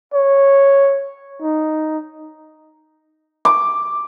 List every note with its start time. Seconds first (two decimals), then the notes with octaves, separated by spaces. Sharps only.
0.13 C#5
1.42 D#4
3.45 D6